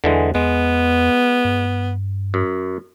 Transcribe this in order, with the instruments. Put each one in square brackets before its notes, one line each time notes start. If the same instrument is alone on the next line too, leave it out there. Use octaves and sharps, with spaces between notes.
[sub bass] E2 [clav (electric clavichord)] D3 E3 G#3
[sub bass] E2 [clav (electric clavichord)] G#3 [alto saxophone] B3
[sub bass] G2
[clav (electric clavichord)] F#2